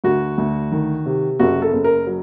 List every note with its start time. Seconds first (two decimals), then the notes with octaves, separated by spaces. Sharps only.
0.04 D2 F#4
0.38 D2
0.72 D#3
1.06 C3
1.39 F#1 F#4
1.62 A4
1.73 F#1
1.84 A#4
2.07 F#3